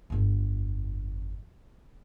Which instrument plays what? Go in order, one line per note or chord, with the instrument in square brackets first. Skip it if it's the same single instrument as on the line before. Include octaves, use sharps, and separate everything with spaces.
[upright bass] G1 F2